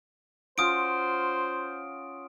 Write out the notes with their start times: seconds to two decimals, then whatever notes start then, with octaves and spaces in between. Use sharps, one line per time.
0.58 C#4 F4 F#4 C5 D#6 D7